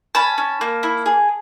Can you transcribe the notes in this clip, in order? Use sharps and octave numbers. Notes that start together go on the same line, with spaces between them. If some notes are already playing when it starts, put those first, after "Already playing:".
C#4 A5 B5
C#4
A#3
E4
G#4